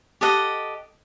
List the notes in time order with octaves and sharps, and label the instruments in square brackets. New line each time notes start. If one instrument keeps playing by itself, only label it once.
[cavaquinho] G4 A4 D#5 F#5